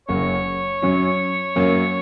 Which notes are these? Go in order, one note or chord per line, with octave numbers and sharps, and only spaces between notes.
F#1 F#2 F#3 A#3 F#4 C#5
F#2 F#3 C#4
F#2 F#3 A#3